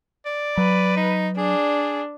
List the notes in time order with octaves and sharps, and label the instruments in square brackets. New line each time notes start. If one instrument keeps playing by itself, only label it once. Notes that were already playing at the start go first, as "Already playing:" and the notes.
[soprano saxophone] D5
[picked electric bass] F#3 [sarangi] B4
[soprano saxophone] D#4
[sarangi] D4 [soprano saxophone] G#4